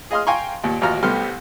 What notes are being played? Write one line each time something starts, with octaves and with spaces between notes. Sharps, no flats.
G#4 D#5 F5 C6 D#6 F6
F5 G5 G#5 A#5 C6 C#6
D#2 A#2
A1 D#2 F4 F#4 A#5 F6
C2 A3 B3 G4 C6 F6